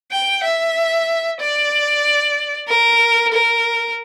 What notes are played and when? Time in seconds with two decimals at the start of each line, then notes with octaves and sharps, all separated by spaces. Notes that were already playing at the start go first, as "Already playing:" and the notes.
0.12 G5
0.44 E5
1.40 D5
2.69 A#4
3.33 A#4